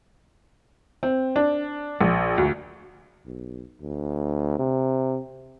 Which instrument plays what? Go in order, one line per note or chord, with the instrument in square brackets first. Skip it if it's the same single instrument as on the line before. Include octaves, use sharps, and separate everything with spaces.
[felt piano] C4
D4
A#1
D2
[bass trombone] B1
D2
C3